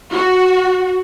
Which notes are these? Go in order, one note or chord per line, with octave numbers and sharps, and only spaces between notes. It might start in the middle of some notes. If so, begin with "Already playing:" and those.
F#4